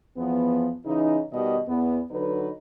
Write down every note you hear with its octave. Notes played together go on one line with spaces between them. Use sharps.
E2 F3 B3
C#3 E3 D#4
B2 D#3 G3 D#5
E2 B3
D3 F#3 D#4 B4